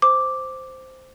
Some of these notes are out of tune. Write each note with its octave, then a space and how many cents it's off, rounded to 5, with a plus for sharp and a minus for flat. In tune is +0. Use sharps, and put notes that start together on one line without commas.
C5 -5 D6 +0